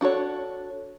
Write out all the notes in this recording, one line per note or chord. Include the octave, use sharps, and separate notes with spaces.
D4 F#4 A4 C#5